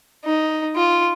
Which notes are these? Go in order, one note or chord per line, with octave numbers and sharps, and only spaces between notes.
D#4
F4